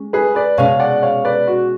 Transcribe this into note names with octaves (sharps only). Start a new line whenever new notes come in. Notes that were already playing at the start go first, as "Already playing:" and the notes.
Already playing: G#3 C#4
G#4 B4
B4 D5
B2 G#3 C#4 C#5 F5
D5 F#5
C#5 F5
B4 D5
F#4